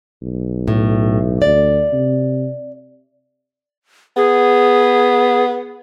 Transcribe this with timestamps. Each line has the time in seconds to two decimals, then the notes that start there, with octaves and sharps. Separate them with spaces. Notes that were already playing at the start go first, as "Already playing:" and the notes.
0.22 B1
0.68 A2
1.42 D2 D5
1.92 C3
4.17 B3 G#4